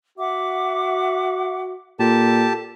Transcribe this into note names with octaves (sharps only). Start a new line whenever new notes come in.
F#4 E5 F#5 D6
A#2 G4 A4 A5